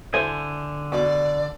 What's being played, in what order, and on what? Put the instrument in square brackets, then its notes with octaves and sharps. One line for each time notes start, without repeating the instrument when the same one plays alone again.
[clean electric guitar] D3 G#5 [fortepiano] E4 A4 C5
[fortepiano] B2 [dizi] D5